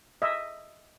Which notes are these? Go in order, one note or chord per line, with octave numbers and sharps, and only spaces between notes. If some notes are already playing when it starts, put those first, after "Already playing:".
D#5 E5